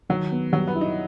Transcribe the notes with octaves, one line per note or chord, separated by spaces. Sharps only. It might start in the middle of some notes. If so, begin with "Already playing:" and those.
D#3 F#3
B3
F#3 G3
B3
E4
D#4